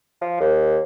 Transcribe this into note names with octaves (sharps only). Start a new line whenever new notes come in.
F3
D#2